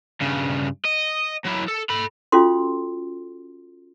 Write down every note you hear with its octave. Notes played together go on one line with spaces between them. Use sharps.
G2 C#3
D#5
F#3 E4
A4
A4 B5
C#4 F4 F#4 A4 C6